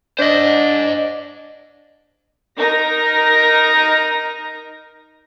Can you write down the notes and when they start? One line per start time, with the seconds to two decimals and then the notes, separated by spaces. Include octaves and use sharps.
0.19 D4 C5 D#5
2.60 D#4 A#4 A#6